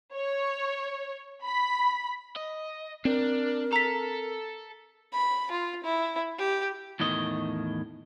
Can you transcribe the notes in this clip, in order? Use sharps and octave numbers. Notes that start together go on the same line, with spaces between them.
C#5
B5
D#5
C4 D4 A#4
A4 A#5 B6
B5
F4
E4
G4
E2 A2 D#3 D#5